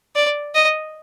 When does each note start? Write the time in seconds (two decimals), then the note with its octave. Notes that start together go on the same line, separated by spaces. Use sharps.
0.16 D5
0.55 D#5